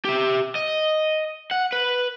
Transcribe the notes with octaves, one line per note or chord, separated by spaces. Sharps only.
G4 E5
D#5
F#5
B4